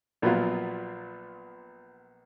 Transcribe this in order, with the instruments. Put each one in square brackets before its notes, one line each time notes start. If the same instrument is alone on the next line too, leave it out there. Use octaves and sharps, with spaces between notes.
[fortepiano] A#1 A#2 F#3 B3 F4